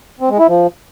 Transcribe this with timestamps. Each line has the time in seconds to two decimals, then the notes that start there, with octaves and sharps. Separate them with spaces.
0.21 C4
0.30 G#3
0.39 E4
0.48 F3